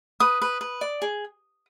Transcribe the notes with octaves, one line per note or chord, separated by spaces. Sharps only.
B4 D#6
B4
B4
D5
G#4